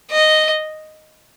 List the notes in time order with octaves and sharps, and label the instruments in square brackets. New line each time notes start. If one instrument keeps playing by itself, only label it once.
[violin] D#5